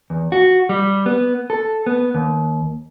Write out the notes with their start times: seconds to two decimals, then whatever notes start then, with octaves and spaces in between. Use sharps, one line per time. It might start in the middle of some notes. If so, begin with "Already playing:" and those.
0.10 E2
0.32 F#4
0.69 G3
1.06 B3
1.50 A4
1.86 B3
2.15 D#2